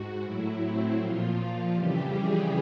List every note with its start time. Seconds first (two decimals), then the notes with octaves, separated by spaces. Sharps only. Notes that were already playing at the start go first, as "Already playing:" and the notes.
Already playing: G#2 F#4
0.23 A2 F#3 E4
0.61 C4
0.99 A#2 F3 F4
1.75 F2 C#3 E3 G3 G4
2.13 G#4